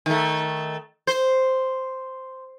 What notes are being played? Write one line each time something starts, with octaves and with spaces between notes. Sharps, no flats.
D#3 A3
C5